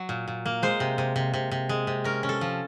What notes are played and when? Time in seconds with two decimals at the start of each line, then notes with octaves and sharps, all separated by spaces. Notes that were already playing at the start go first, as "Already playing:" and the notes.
Already playing: F#3
0.09 A#2
0.28 A#2
0.46 A#3
0.62 G#3 C5
0.80 C3
0.98 C3
1.16 C3
1.34 C3
1.51 C3
1.69 G#3
1.87 C3
2.04 C#4 A#4
2.23 C#4
2.29 A4
2.41 F3